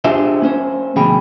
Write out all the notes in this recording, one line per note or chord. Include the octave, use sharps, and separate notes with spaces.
D4 F4 G4 G#4 C5 E5
A#3 C#4 C5
D2 B2 F3 G#4 G5 B5